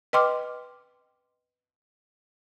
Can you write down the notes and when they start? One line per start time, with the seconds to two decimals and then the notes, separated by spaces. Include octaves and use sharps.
0.13 B4 D#5 G5 C6 D6 F6